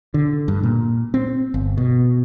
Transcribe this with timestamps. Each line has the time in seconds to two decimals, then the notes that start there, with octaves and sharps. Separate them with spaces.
0.14 D3
0.48 G2
0.63 A#2
1.14 C4
1.54 G1
1.78 B2